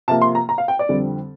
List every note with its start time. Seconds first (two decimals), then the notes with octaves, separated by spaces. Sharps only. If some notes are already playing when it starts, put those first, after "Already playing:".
0.08 C3 F3 A#3 A5
0.22 C6
0.35 A#5
0.49 A#5
0.58 F5
0.68 G5
0.79 D5
0.89 F2 D3 G3 C4